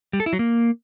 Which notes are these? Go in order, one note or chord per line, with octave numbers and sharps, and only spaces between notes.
G3
A4
E4
F#3
A#3